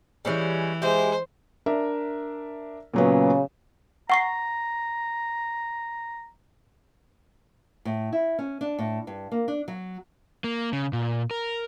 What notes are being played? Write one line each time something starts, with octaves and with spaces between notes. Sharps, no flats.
E3 G3 G#3 C#4
G#3 E4 G4 C5
D4 A#4 E5
A#2 C#3 F#3 B3
F#5 A#5 C#6 C7
A2
E4
C#4
D4
A2
G2
A#3
D4
F#3
A#3
C#3
A#2
A#4